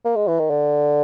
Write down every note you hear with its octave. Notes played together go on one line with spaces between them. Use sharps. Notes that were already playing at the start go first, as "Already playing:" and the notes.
A#3
G#3
E3
D#3
D3